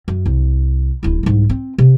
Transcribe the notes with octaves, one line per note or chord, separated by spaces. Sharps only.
F#2
C2
D1 E4
C2 G#2
C4
C3